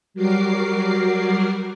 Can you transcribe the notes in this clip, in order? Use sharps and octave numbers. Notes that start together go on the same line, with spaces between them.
F#3 G3 F#4 A#4 D6 C7